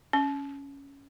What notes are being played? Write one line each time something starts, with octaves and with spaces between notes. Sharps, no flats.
C#4